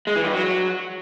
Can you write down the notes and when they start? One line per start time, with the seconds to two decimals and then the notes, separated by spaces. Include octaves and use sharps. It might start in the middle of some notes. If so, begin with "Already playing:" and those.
0.07 G#3
0.16 E3
0.24 G2
0.33 F#3